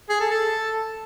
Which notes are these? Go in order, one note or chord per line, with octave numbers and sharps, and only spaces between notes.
G#4
A4
A4